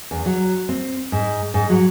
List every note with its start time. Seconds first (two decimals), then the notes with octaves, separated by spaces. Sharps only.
0.11 E2
0.26 F#3
0.69 C4
1.12 G#2
1.54 G#2
1.70 F#3